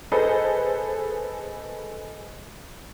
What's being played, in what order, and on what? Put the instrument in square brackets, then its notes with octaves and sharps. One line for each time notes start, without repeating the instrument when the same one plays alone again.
[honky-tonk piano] G#4 A4 B4 C5 D#5